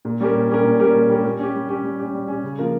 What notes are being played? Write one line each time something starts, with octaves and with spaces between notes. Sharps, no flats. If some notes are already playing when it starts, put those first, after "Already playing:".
A#2
G3 C#4 G4 A#4
A#2
G3 C#4 G4 A#4
A#2
G3 C#4 G4 A#4
A#2
G3 C#4 G4 A#4
G3
C#4 G4
G3
C#4 G4
G3
C#4 G4
G3
C#4 G4
C#3
F3 A#3 F4 A#4